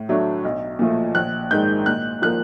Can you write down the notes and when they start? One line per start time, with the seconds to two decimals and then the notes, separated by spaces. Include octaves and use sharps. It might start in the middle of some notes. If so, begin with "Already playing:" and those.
Already playing: A2
0.09 F#3 A3 D4
0.45 B1
0.79 A#2 F3 A3
1.15 A#1 F#6
1.51 G#2 D#3 G#3 G6
1.86 A#2 F#6
2.22 F3 A#3 F#6